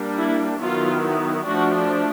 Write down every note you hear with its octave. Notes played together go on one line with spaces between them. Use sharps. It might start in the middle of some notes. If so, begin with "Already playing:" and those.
Already playing: G3 A#3 D4
E4
D#3 F#3 B3 E4 F4
F3 A3 D4 F#4